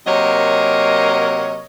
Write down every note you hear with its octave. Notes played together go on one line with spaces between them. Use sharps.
C3 F#3 A#3 A#4 C#5 D#5